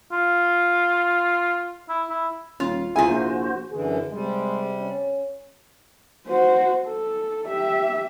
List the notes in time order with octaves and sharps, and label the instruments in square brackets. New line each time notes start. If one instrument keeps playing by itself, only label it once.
[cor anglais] F4
E4
E4
[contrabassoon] D#1 [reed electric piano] C#4 [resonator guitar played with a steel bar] F4
[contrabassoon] C#2 [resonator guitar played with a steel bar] C3 G#5 [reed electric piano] E4 F4 G#4
[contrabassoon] A#1 [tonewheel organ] F#4 C5
[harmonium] F#2 D3 E3 [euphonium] G#4
[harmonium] C3 G3 [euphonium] G#3
[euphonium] C#4
[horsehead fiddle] F#4 C5
A4
G4 E5